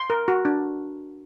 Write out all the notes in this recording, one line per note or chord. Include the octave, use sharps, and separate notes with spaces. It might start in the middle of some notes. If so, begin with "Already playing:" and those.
Already playing: C6
A#4
F#4
D4